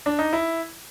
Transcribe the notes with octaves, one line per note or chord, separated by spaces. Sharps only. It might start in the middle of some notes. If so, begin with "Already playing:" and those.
D4
D#4
E4